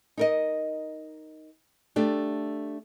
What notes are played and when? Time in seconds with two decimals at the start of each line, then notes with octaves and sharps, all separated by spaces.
0.17 D#4 A#4 D#5
1.96 A3 D4 G4